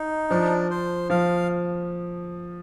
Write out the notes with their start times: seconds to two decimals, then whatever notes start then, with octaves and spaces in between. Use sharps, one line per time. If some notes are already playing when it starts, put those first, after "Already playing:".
Already playing: D#4
0.30 F3 D4
0.70 C5
1.10 F3 F5